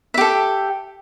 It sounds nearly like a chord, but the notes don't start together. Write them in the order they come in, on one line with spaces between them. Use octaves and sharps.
E5 G4 A4